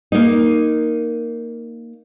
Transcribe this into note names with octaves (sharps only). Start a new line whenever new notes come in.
A#3 D#4